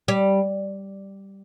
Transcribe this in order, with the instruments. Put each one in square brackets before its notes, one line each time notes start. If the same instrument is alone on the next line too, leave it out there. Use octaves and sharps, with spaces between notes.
[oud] G3